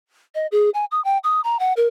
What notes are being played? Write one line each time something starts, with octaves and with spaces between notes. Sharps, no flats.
D#5
G#4
G#5
D#6
G5
D#6
A#5
F#5
A#4